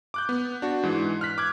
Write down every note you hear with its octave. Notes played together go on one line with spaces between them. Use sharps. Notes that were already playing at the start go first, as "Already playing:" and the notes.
D6 F#6 G6
B3
D4 F#4
G#2 E3
F6 F#6 B6
D6 F#6 G#6